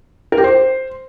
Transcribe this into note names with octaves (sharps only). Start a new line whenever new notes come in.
A#4
G4
C5